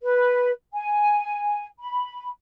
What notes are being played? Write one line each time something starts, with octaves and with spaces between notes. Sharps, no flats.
B4
G#5
B5